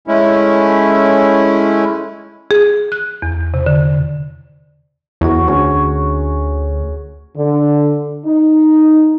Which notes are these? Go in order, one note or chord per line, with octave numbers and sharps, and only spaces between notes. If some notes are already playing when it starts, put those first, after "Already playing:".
G#3 A3 C#4 E4
G#4
F#6
E2
C3
D3
E2 F#4 A#4 C#5
D2 C#4 G#4 C#5
D3
D#4